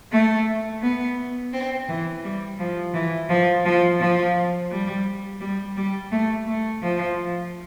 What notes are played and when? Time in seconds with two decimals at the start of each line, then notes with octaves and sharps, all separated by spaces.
0.12 A3
0.82 B3
1.53 C4
1.88 E3
2.23 G3
2.59 F3
2.94 E3
3.29 F3
3.65 F3
3.99 F3
4.71 G3
5.41 G3
5.76 G3
6.12 A3
6.47 A3
6.82 F3